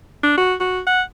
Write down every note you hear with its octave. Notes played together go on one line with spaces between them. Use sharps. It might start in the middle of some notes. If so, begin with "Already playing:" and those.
D4
F#4
F#4
F#5